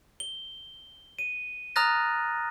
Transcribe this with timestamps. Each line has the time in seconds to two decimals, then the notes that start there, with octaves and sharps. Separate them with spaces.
0.20 G7
1.19 D#7
1.76 A#5 D#6 F6 F#6 A6 A#6